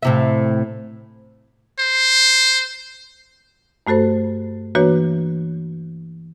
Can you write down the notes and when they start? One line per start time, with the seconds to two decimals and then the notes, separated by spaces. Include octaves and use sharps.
0.03 A2 C3 E5
1.79 C5
3.87 G2 A3 F#4 A4 C5
4.75 E3 A#3 D4 F#4 B4 C#5